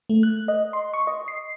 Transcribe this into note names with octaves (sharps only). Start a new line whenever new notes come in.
A3
F#6
D#5
C6
C#6
D#5
C7